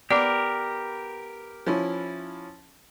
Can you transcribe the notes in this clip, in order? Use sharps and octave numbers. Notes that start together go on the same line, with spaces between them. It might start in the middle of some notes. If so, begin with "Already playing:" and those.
B3 G4 A#4 D5 D6
F3 C#4 E4